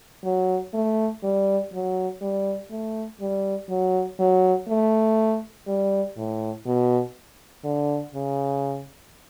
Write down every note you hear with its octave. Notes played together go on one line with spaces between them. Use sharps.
F#3
A3
G3
F#3
G3
A3
G3
F#3
F#3
A3
G3
A2
B2
D3
C#3